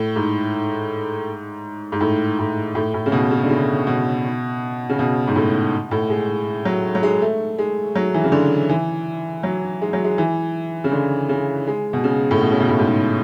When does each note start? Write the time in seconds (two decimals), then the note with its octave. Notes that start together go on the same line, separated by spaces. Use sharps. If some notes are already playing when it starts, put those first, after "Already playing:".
Already playing: A2
0.16 G#2
1.92 G#2
2.01 A2
2.39 A2
2.75 A2
2.94 A2
3.06 C#3
3.12 B2
3.31 C#3
3.44 D3
3.49 C#3
3.87 B2
4.89 C#3
4.99 B2
5.27 G#2
5.36 A2
5.91 A2
6.10 G#3
6.65 F#3
6.95 F#3
7.03 G#3
7.22 A3
7.59 G#3
7.95 F#3
8.14 E3
8.24 C#3
8.32 D3
8.69 E3
9.43 F#3
9.82 G#3
9.93 F#3
10.05 G#3
10.18 E3
10.84 C#3
10.92 D3
11.29 C#3
11.67 G#3
11.93 B2
12.04 C#3
12.31 A2
12.41 B2
12.52 C#3
12.60 B2
12.69 A2
12.79 G#2